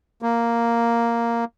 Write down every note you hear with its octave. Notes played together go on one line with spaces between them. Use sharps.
A#3